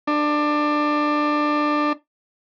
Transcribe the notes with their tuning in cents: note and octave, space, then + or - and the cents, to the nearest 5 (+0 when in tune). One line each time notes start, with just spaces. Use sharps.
D4 +20